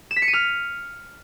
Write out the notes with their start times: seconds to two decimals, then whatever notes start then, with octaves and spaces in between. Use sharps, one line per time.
0.11 E7
0.16 B6
0.22 C#7
0.28 D#7
0.33 F6